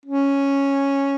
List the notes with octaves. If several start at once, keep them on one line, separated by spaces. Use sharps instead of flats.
C#4